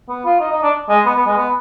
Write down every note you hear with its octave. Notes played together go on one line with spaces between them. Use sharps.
B3
F4
D#4
D#4
D4
G#3
B3
B3
G#3
B3